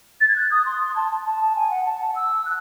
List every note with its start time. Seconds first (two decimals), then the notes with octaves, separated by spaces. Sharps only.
0.20 A6
0.28 G#6
0.36 F#6
0.51 D#6
0.66 C6
0.81 C6
0.95 A5
1.26 A5
1.55 G#5
1.70 F#5
1.85 A5
2.00 F#5
2.15 E6
2.45 F#6